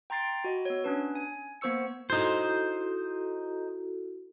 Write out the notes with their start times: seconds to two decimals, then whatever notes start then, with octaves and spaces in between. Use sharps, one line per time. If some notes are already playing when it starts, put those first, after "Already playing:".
0.10 G5 A#5 C6 A6 C7 D7
0.44 F#4 D#5 B5
0.65 B3 C#5
0.84 C#4 D4 B4
1.15 G#5
1.61 A#3 B3 C5 C#6 E6 C#7
2.10 D#4 E4 F#4 A4 C5